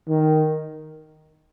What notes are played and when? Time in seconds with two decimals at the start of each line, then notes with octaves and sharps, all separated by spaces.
0.09 D#3